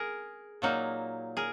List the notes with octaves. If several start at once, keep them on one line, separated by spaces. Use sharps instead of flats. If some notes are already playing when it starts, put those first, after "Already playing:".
Already playing: G#4 A#4
A#2 F#3 A#3 D#4
G#4 A#4